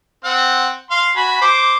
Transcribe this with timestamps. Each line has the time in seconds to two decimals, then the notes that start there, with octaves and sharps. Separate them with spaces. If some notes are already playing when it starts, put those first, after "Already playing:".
0.24 C4 F#5
0.91 F5 C6
1.16 F#4 G#5 B5
1.41 C5 D6